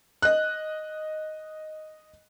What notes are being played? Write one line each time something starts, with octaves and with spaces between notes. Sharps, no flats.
D#5 F#6